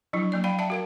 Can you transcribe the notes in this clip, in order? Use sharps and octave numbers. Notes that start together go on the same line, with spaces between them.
F3 F#3 D4 E4
F#3 A#3 D5
D5 F5 G5 B5
D5 E5 F5 G5 A5
F#4 A#4 F5